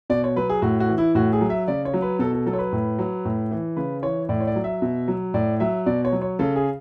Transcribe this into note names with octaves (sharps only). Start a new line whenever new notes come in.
B2 D5
C#5
F#3 B4
G#4
A2 F#4
F#4
E3
E4
A2 F#4
G#4
F#3
E5
C#3 D5
C#5
F#3
B4
B2 A4
A4
F#3 A4
C#5
B4
A2
F#3
A2
E3
C#3 B4
E3 C#5
A2 D5
C#5
D5
F#3
E5
B2
F#3
A2 D5
F#3 E5
B2 D5
C#5
F#3
C#5
C#3 A4
G#4